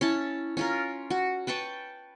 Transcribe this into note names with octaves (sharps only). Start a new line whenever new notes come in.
C#4 E4 A5
C#4 F4 A#4
F#4
B4 G5 A5 C#6